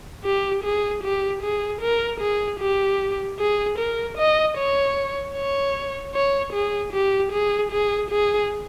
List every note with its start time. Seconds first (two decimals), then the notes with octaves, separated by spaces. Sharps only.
0.24 G4
0.64 G#4
1.03 G4
1.42 G#4
1.82 A#4
2.20 G#4
2.60 G4
3.39 G#4
3.78 A#4
4.18 D#5
4.58 C#5
5.35 C#5
6.14 C#5
6.53 G#4
6.93 G4
7.32 G#4
7.72 G#4
8.11 G#4